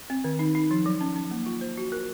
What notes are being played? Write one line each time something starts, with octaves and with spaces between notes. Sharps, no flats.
C4
D#3
D#4
D#4
F3
F#3
C#4
C#4
A#3
F4
C5
F#4
A#4